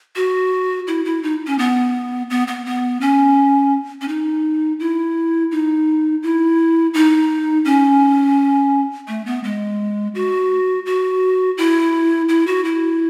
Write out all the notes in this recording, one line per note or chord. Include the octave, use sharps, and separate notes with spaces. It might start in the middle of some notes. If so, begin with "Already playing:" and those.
F#4
E4
E4
D#4
C#4
B3
B3
B3
B3
C#4
C#4
D#4
E4
D#4
E4
D#4
C#4
A3
B3
G#3
F#4
F#4
E4
E4
F#4
E4